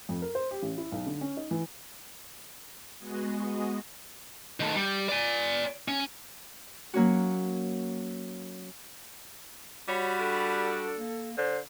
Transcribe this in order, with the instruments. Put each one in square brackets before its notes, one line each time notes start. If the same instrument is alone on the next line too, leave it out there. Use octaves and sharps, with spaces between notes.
[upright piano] F2
A#4
C5
G4
A1
E4
B1
D3
C#4
D#4
E3
[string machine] G#3 B3 F#4 G#4 D#5
[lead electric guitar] D#3 A3
G3
D5 G#5
C#4
[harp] F#3 A#3 C#4 F#4
[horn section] G3 F#4 [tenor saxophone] C#5 [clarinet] B5
[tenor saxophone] D4 [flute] A4
[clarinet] A#3
[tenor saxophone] D3 [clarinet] C5